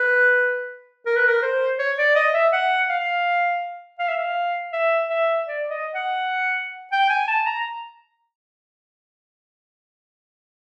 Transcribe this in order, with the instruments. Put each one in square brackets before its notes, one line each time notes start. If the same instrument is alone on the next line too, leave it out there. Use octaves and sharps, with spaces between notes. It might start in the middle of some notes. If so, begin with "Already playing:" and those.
Already playing: [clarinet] B4
A#4
B4
A#4
C5
C#5
D5
D#5
E5
F#5
F5
F5
E5
F5
E5
E5
D5
D#5
F#5
G5
G#5
A5
A#5